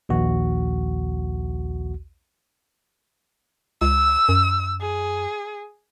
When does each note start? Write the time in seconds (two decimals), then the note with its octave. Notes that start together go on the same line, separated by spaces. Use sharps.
0.09 A#1 D#2 F#4
3.82 C#2 E6
4.29 F#2
4.81 G#4